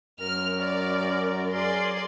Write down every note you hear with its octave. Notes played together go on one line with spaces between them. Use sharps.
F#2 A#4 F6
D5
F#3 G#4 D5 C6